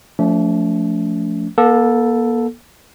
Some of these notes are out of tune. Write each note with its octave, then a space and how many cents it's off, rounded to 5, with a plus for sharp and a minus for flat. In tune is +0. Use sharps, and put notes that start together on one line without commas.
F3 +0 A3 +0 D4 -45
A#3 +40 A4 +0